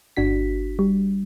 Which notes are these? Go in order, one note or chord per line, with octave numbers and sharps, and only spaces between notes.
G1 D4 F#4 B6
G3